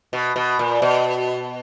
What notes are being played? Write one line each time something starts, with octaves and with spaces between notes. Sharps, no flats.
B2
B2
A#2
B2